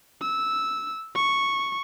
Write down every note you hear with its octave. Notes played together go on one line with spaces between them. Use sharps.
E6
C#6